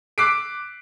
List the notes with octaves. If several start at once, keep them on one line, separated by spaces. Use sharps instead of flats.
D6 E6 F#6 B6 C7 D7